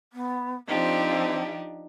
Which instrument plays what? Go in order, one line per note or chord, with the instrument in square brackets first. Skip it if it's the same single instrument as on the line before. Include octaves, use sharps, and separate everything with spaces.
[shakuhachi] B3
[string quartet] F3 G4 [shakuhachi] C4 [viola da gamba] D4 D#4